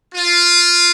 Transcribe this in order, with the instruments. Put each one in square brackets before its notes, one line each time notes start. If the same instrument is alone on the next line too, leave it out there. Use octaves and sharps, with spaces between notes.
[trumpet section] F4